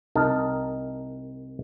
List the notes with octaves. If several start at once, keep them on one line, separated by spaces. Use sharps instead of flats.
C2 D#4 A#4 A5